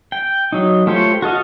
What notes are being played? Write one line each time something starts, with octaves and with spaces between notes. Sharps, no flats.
G5
F#3 D#4
A3 F4 G4 C5 C#5
F#4 A4 D#5 F5